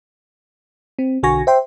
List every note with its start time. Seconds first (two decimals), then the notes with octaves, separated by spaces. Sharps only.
0.99 C4
1.23 B1 D3 F#4 G#5 C#6 A#6
1.47 C5 E5 G5 C6